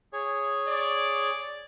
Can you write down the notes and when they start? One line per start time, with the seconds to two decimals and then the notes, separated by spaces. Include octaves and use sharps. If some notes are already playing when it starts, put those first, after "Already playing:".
0.13 G#4 C#5
0.69 D5